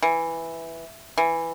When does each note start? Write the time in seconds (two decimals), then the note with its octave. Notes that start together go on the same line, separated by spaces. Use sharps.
0.02 E3
1.18 E3